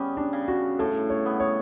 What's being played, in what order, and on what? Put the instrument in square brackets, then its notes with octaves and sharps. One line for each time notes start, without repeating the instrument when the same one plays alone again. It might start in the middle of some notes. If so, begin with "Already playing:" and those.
Already playing: [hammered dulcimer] C#3 G3 B3 [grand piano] C#4
[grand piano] D4
[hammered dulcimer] C#3
[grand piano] F#4
[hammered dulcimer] A2 [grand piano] A4
[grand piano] C#5
[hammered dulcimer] B3
[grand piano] C#5